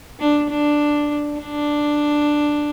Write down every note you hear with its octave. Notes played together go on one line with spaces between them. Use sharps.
D4
D4
D4